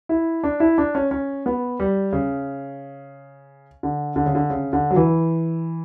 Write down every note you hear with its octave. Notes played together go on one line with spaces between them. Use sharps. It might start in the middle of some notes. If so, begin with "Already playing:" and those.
E4
D4
E4
D4
C#4
C#4
B3
G3
C#3
D3
D3
C#3
D3
C#3
D3
F#3
E3